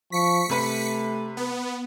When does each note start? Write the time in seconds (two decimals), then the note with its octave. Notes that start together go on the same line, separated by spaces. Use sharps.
0.12 F3 C#6 B6 C#7
0.50 C3 A3 G4 B4
1.37 B3